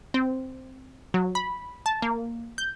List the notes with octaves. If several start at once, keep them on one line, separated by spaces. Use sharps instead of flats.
C4
F#3
B5
A5
A#3
G6